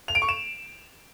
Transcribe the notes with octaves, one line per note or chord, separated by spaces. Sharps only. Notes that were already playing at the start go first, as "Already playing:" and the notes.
F7
D7
C#6
E7